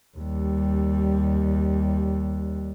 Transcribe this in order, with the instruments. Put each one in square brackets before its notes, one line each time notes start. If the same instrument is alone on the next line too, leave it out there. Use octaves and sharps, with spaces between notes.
[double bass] D#2 G3